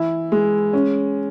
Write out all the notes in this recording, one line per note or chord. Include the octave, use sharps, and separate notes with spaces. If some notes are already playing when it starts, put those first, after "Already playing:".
Already playing: E3 E4
G#3
C#4